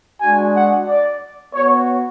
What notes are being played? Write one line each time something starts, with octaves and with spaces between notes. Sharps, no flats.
G#3 D4 F#4 G#5
F#5
D5
B3 F#4 C#5